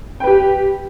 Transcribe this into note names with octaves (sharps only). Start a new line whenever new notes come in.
G4 B4 G5